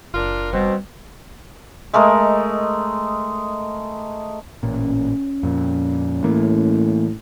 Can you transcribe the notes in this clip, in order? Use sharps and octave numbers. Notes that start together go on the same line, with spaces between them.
F#1 D4 F4 A#4
B2 G3 C4
G#3 A3 A#4 D#5
A1 A#2 C#4
F2 A#2
A2 E3 A#3